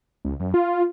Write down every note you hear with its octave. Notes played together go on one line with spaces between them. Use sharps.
C#2
F#2
F4